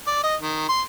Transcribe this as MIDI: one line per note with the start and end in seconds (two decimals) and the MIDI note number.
0.07 0.20 74
0.23 0.35 75
0.41 0.66 51
0.68 0.82 84